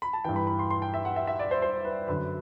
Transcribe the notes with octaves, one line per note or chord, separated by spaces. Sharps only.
B5
A5
G2 E3 G5
B5
B5
C6
C6
G5
E5
F#5
E5
E5
D5
C5
C5
B4
F#2 D3 B4